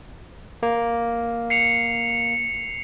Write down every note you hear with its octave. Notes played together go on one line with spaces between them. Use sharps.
A#3
C7 C#7 F7